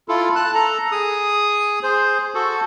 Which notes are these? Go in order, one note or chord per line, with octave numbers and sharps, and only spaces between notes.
E4 F4 A4
A5 F#6
A4 A#5
G#4 D#6
G#4 C5
F#4 A4